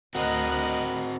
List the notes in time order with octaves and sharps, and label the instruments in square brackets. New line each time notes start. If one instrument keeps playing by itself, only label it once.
[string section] D2 D#5 F#6 [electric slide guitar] C4 F#4 [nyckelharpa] A#4 B5